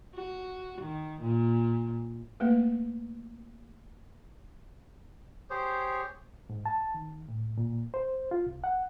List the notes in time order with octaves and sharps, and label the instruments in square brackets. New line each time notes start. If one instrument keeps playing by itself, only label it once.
[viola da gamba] F#4
D#3
A#2
[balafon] A3 A#3 C4 B4
[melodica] G4 G#4 C5 C#5
[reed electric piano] G#2
A5
D#3
A2
A#2
C5
F4
C2
F#5